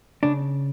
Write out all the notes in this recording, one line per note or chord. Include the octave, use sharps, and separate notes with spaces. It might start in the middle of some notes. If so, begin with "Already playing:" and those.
C#3 D4